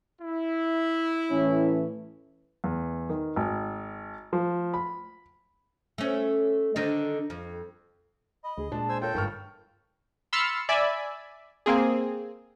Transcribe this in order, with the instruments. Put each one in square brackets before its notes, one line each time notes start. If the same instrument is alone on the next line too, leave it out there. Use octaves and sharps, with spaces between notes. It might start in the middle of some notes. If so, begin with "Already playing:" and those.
[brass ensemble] E4
[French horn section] A2 E3 C#4
[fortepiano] E2
D#3
G#1
F3
B5
[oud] A3 C#4
D3 D#3 D4
F2
[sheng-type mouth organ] D#5 [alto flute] B5
[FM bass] D2 [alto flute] G#4
[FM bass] A#2 [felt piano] G#3 D4 [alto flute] A5
[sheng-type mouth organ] C5 G#5 E6
[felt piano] F4 A#4 [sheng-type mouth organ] A4 G5 [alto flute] C#5
[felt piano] G1 C#6 F6 [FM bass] G#2 [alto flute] A#4
[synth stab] B5 C6 E6 F6 A6 C#7
D5 E5 G#5 B5
A#3 C4 G#4